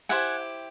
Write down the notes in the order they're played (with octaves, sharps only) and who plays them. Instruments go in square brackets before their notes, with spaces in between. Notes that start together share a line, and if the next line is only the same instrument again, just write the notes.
[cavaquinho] E4 G4 C5 F#5 G#5